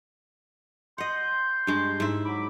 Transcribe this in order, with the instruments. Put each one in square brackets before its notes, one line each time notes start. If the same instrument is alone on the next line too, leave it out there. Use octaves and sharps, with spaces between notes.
[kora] D#5 F#5 [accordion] C6 G6
[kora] G2 G#3
G#2 E4
[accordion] F#3 B5 D6